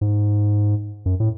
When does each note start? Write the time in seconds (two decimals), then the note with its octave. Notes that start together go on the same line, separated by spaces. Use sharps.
0.01 G#2
1.06 F#2
1.20 A2